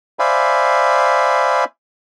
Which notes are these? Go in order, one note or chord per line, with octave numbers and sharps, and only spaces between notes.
C5 D5 E5 F5 G#5 B5